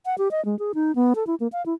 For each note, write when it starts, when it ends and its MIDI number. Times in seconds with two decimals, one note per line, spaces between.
0.06 0.15 78
0.18 0.31 67
0.31 0.43 75
0.45 0.58 56
0.59 0.72 68
0.75 0.94 63
0.95 1.13 59
1.16 1.26 69
1.27 1.35 64
1.40 1.48 58
1.52 1.64 77
1.66 1.74 64